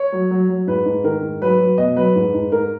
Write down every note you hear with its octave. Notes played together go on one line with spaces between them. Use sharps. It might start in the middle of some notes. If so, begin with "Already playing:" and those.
Already playing: C#5
F#3
F#3
F#3
G#2 B4
G#2
D#3 A#4
G#2
F#3 B4
F#3
B2 D#5
F#3 B4
G#2
G#2
G#2 A#4